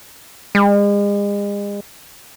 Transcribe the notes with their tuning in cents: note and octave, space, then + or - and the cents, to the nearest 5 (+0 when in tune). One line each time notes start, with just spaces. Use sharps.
G#3 -40